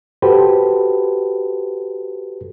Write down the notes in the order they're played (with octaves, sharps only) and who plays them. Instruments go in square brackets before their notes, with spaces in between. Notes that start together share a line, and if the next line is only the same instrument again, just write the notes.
[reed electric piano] F#4 G4 A4 B4 C5